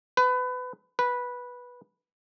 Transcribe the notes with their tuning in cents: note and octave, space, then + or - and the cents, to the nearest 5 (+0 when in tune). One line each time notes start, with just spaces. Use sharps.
B4 +25
B4 -10